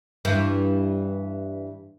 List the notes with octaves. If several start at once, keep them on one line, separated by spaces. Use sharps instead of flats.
G2 E3